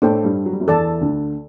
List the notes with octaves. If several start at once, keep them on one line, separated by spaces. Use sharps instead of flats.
A2 A3 D4 A4 C5 G5
G2 G3
F#3
G3
F#2 F#3
E2 E3 A4 D5 A5
D2 D3